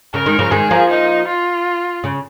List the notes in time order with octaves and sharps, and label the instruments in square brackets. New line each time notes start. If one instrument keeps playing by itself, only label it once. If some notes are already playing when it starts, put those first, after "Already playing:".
[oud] C#3 [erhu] A#4
[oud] D#3 G#3
C#3 F3
[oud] D#3 G#3 [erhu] G#4
[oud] F3 A#3
[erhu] D#4
F4
[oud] C#3